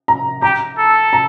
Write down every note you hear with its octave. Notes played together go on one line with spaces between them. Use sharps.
A#5
G4 A#5
A4
A#5